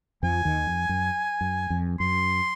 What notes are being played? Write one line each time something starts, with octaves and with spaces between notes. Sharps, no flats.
F2 F3 G#5
D#2 D#3
F2
F#2
F#2
F2
F#2 C6